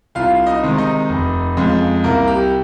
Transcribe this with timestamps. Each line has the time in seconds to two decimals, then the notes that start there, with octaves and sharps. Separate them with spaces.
0.15 C2 F4 F5
0.46 D#4 D#5
0.63 C3 D#3 G#3
0.78 D#4 D#5
1.09 F1
1.57 F2 C#3 G#3
2.04 C2 A#3 A#4
2.27 G4